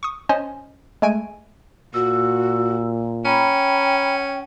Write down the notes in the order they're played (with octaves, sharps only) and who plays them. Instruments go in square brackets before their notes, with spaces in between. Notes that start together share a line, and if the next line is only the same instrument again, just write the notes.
[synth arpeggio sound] C#6 D#6
C#4 C5 D#5 G#5
G#3 A3 G#5 D7 D#7
[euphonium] A#2 [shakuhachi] F#4 [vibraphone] E6
[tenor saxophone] C#4 [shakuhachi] G5 [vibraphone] A#5 B5